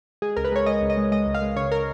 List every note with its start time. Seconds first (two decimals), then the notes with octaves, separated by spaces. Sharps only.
0.22 G#3 G#4
0.36 C#2 A#4
0.45 B4
0.52 G#3 C#5
0.66 G#3 D#5
0.82 C#2
0.90 D#5
0.97 G#3
1.12 G#3 D#5
1.27 C#2
1.34 F5
1.42 G#3
1.56 C#3 C#5
1.72 A#4